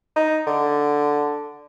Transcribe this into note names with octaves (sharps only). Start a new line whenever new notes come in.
D#4
D3